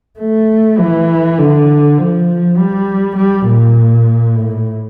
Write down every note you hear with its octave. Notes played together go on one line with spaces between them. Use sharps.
A3
E3
D3
F3
G3
G3
A#2
A2